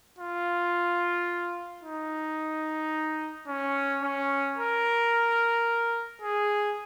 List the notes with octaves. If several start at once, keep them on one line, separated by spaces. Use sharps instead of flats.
F4
D#4
C#4
C#4
A#4
G#4